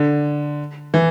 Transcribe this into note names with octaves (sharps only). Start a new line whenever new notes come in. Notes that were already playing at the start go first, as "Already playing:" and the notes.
Already playing: D3
E3